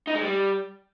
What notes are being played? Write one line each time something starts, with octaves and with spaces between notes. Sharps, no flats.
D#4
G#3
G3